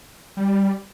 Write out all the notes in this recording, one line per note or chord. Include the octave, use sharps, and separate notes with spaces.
G3